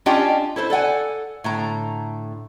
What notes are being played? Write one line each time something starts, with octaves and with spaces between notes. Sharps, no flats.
C#4 D4 F4 G4 D#5 G5
E4 A4 C5
A4 D5 F#5 G#5
A2 D3 A#5